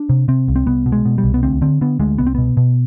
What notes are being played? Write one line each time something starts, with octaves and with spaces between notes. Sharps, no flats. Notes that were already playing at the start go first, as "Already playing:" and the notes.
Already playing: D4
C3
C3 C4
C2
C4
C2 B3
B2
G#3
B2
G3
C2
B3
D2 C4
D3 C4
D3 B3
D2 G#3
C2 B3
C4
B2 B3
B2